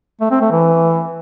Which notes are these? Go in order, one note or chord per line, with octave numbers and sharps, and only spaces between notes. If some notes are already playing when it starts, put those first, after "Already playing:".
A3
C4
A3
E3